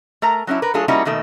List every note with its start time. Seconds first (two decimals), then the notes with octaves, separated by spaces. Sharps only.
0.22 A3 A#4 A#5
0.47 F#3 C#4 D4 E4
0.62 A#4 B4
0.74 F#3 A3 D4 F4 G#4 A4
0.88 G3 A#3 C#4 D#4 E4 F#4
1.05 B2 D#3 A3 A#3